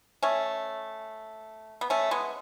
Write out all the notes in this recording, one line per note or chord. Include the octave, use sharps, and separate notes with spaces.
A3 C#4
B3
A3 C#4
G#3 B3